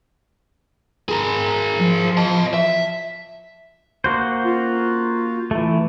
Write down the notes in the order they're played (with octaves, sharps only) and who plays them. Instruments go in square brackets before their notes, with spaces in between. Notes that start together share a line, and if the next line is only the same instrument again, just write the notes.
[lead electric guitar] G#4 A#4
[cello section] F3
[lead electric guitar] D#5 A5
E5
[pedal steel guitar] A#3 F#4 C5
[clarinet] F4
[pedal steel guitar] E3 A3